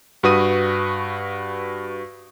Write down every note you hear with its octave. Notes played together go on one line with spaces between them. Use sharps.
G2 F#4 B4 D#6 D#7